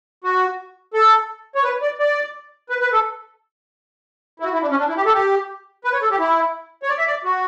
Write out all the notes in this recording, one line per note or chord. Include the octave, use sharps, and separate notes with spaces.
F#4
A4
C#5
B4
D5
D5
B4
B4
A4
E4
F#4
E4
D4
C#4
D4
E4
G4
A4
G4
B4
C#5
A4
G4
E4
C#5
D5
E5
D5
F#4